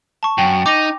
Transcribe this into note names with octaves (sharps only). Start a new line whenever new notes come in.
A5 C#6
F#2 G5
D#4 D6 A#6